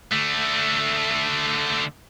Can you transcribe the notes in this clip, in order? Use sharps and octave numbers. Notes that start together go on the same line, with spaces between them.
D3 A3